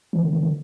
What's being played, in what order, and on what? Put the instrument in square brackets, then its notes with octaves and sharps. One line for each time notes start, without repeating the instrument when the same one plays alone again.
[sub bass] E3
D3
D3
D3